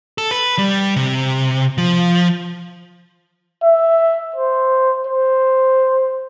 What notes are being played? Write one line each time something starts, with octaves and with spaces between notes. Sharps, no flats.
A4
B4
G3
C3
F3
E5
C5
C5